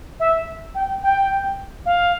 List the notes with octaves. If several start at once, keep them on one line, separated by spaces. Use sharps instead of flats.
E5
G5
G5
F5